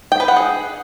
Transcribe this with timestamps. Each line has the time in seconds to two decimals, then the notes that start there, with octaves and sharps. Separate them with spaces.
0.12 G5
0.20 B4
0.28 F#5
0.36 G#4